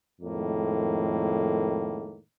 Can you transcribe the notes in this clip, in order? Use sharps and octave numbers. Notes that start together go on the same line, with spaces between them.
F2 A2 D#3 G#3 A#3